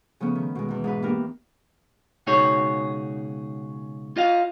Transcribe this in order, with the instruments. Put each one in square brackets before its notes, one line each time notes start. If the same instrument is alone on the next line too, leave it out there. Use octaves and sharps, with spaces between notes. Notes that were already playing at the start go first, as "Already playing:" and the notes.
[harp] C#3 F3 A3 B3 C#4
D#3
B2 G#3
E2 E3
G#2 E4 B4
A#3 B3 D4 G4 A#4
[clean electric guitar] C#2 B2 D#4 F#4 G#4 C#5
F4 D#5 F5